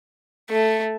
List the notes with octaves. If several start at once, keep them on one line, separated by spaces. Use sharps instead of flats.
A3